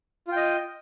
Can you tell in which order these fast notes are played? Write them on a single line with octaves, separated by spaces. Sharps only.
F4 G5 D#5